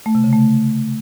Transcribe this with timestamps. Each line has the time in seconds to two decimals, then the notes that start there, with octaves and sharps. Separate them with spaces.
0.06 A3
0.15 C3
0.24 C#3
0.33 A3